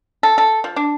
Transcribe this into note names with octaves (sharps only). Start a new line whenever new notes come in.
A4
A4
F3
D4